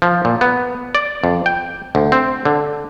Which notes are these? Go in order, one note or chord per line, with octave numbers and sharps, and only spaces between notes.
F3
A#2
B3
D5
F2
G5
D2
C4
D3